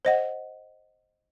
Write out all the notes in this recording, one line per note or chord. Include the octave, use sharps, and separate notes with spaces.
C5 D#5 F#5